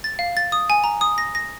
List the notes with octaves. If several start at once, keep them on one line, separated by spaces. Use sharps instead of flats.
A6
F5
A6
D#6
G#5
A#5
D#6
A#6
A#6